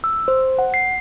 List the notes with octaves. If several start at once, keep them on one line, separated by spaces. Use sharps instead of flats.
E6
C5
F#5
C7